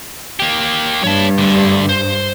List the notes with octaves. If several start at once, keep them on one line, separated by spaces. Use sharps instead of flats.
A#3 G4
G2 C#5 A5
D2 D3
C5